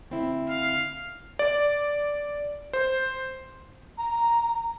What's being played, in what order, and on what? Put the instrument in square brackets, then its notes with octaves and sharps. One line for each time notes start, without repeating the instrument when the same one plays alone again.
[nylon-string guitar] D2 C4 E4
[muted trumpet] F5
[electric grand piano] D5
C5
[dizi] A#5